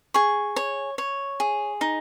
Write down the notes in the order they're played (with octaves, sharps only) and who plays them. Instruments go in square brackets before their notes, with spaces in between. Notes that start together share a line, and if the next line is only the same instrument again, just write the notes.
[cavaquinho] G#4 C#6
C#5
C#5
G#4
D#4